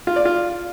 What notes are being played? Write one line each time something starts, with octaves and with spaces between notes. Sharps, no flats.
F4
D5
F4